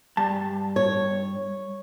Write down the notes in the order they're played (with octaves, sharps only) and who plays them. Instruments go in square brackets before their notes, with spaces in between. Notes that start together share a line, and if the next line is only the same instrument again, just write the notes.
[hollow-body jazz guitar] G2 A5
[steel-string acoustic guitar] C#5